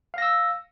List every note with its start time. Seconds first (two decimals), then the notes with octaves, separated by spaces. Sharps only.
0.14 F5
0.18 A#6
0.22 E6